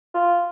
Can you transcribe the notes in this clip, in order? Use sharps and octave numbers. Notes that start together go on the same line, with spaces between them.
F4